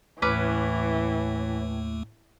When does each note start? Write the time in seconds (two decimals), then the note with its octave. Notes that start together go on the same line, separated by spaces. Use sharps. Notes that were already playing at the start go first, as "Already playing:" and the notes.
0.22 D#2 A2 E3 A3 C#4 B4 D6